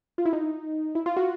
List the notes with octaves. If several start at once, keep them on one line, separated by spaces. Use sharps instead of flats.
F4
E4
D#4
E4
F4
F#4